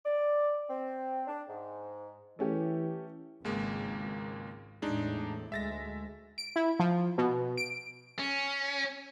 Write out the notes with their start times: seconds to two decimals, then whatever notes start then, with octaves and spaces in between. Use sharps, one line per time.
0.05 D5
0.69 C4
1.27 D4
1.49 G#2
2.39 E3 A3 C#4 G4
3.45 G#1 C#2 G#3 A#3
4.82 E2 A2 G#3 D4 D#4
5.52 D2 G#3 E5 A6 A#6
6.38 D7
6.56 E4
6.79 F3
7.18 B2
7.57 D7
8.19 C#4